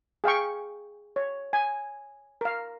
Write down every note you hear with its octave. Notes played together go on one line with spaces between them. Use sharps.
G#4 F5 G5 C#6
C#5
G#5
A#4 F5